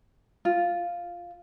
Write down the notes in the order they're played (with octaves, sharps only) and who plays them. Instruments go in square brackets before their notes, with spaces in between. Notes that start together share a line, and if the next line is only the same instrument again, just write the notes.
[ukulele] F4